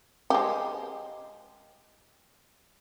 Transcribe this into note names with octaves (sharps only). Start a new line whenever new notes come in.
G#3 G4